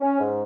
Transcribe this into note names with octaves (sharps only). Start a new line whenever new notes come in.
C#4
G#2